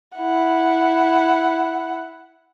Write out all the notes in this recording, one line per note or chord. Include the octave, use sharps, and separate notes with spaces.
E4 F#5